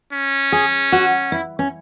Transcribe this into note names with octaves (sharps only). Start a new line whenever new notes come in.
C#4
G#4
F#4
E4
C#4